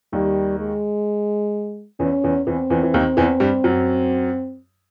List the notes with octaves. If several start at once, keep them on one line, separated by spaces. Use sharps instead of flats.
D#2 D#3 G3
G#3
E2 E3 C#4
E2 E3
E2 E3 C4
E2 E3
E3
D#2 D#3
E2 E3
G2 G3
F#2 F#3